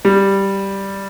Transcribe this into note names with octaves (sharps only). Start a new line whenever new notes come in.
G3